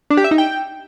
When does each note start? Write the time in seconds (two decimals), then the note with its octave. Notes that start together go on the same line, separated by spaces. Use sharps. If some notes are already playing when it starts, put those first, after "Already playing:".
0.10 D4
0.17 G4
0.24 E5
0.31 D#4
0.38 G5